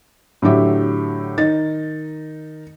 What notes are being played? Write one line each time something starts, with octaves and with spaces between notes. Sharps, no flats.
A2 D3 F#3 G4 E5
D#3 D#4 A6